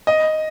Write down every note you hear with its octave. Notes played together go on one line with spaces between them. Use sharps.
D#5